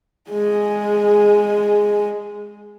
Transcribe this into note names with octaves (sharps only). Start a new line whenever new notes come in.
G#3 G#4